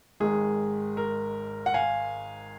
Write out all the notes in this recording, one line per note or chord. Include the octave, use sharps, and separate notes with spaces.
G#1 G#2 D#3 G#3 G#4
A#4
F#5
F5 G#5